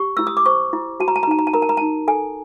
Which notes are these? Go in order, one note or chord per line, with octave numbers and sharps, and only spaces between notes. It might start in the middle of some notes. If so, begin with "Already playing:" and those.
Already playing: G4 C#6
E4 E6
D#6
D6
C5 C#6
E4
F#4 A5
A#5
A5
A#5
D#4 A5
A#5
A5
A#4 A#5
A5
A#5
D#4 A5
A4 G#5